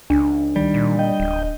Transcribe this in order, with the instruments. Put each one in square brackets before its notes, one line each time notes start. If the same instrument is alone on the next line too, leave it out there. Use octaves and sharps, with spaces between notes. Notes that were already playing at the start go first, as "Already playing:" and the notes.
[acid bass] C#2 [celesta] D4
[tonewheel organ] D#3 [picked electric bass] G3
[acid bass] A#2
[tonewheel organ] D#5 G5
[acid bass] D1